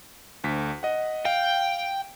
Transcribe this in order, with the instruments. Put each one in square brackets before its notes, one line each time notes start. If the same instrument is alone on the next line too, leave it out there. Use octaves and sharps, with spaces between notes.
[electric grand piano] D2 B6
D#5 F#5
[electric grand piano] F5 [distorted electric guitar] G5